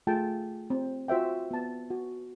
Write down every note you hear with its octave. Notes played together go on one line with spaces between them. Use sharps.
A3 F4 G#4 G5 A5
C4
F4 F#4 C5 E5 G5
B3 A5
F#4